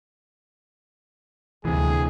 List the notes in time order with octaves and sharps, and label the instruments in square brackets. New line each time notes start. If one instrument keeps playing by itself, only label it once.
[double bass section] D2 [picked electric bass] C3 E3 [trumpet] G#4